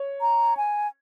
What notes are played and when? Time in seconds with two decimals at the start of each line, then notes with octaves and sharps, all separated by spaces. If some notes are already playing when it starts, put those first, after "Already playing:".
Already playing: C#5
0.21 A#5
0.57 G#5